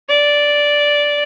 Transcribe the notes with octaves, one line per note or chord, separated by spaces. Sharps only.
D5